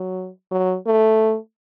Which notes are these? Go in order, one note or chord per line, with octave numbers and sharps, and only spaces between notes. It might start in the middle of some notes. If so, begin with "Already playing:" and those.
Already playing: F#3
F#3
A3